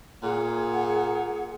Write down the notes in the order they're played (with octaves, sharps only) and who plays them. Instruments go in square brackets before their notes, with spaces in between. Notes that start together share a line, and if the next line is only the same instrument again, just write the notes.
[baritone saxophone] A#2 [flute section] G#4 F#5